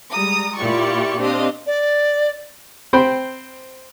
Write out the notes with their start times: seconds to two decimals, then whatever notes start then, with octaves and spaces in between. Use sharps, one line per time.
0.12 G3 G#3 A#5 D#6
0.58 A#2 E4 F4 G4 D5 C#6
1.18 C4 D4 G4 D#5 F5
1.66 D5
2.93 C4 C5 G5 B5